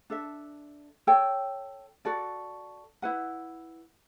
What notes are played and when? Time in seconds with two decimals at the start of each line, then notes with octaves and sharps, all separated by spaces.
0.10 D4 A4 E5
1.07 A4 C#5 G5
2.05 F#4 A4 D5
3.02 E4 B4 F#5